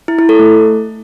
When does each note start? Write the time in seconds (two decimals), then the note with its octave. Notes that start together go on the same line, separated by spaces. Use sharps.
0.08 E4
0.19 E4
0.29 A4
0.39 A3